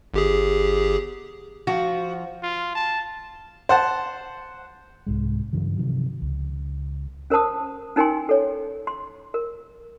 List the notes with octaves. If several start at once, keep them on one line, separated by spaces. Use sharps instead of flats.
G1 G4 G#4
F3 F#4
F4
A5
C5 F#5 A5
C2 G#2 G#3
G2 C#3 E3 F#3
C3 D#3 F3 F#3
C#2
C#4 A#4 C5 A5 D#6
C#4 D#4 A#4 G5 G#5 C6
A4 C#5
C6
A#4